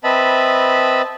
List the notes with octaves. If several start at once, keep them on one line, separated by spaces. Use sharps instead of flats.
C4 B4 D#5 E5 A5 B5